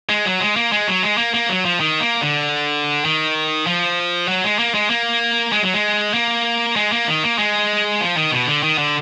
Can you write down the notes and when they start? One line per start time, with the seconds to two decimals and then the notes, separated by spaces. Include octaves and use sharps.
0.10 G#3
0.25 F#3
0.41 G#3
0.56 A#3
0.72 G#3
0.87 F#3
1.03 G#3
1.18 A#3
1.34 A#3
1.49 F#3
1.65 F3
1.80 D#3
2.00 A#3
2.22 D3
3.05 D#3
3.67 F3
4.28 F#3
4.44 G#3
4.59 A#3
4.74 G#3
4.90 A#3
5.52 G#3
5.63 F#3
5.74 G#3
6.14 A#3
6.76 G#3
6.92 A#3
7.08 D#3
7.23 A#3
7.38 G#3
8.01 F3
8.17 D#3
8.32 B2
8.47 D3
8.63 D#3
8.78 D3